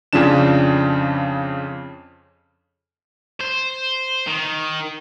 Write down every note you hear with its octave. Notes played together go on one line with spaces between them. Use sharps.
F2 C#3 F3 C#4 D4 E7
C5
D#3